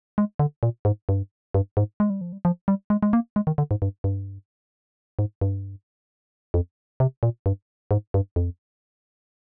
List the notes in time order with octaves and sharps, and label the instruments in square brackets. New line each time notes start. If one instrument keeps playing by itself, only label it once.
[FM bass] G#3
D3
A#2
G#2
G2
G2
G#2
G#3
G3
F3
G3
F3
G3
G#3
G#3
A#3
G#3
D#3
D3
G#2
G2
G2
G#2
G2
F2
C3
A#2
G2
G#2
G2
F2